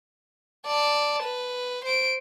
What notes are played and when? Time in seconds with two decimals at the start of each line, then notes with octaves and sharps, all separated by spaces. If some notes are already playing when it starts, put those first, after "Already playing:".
0.67 D5 A5
1.23 B4
1.85 C5 D7